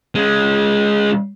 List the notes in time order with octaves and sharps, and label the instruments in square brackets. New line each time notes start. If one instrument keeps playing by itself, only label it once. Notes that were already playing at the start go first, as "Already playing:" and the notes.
[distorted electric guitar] G#3 C#4